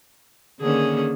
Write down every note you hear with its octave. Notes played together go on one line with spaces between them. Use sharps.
D3 D#3 A#3 C#4 G#4